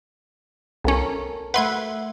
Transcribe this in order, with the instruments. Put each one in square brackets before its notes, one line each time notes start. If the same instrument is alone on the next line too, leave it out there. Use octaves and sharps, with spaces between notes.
[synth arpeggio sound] C2 C#4 [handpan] A4 A#4 C#5
[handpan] A3 E5 F#5 [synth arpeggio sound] B4 C6 G#6